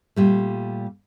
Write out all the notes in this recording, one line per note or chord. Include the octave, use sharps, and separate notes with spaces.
A#2 G3 A3